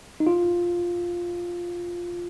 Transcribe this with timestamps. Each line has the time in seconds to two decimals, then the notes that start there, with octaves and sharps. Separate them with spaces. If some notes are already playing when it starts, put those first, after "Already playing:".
0.20 D#4
0.27 F4